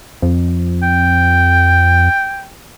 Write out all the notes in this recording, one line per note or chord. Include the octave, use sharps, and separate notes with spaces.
F2
G5